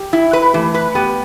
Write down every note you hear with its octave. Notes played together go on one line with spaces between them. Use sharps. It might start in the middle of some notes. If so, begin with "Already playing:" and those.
Already playing: G4
E4
B4
E3 A3
B4
B3 G4